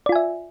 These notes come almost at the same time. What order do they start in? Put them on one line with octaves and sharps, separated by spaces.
D5 F4 G#5 E5